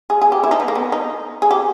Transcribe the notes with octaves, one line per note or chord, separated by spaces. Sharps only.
G#4
G#4
G4
E4
D#4
B3
A#3
B3
D#4
G#4
G4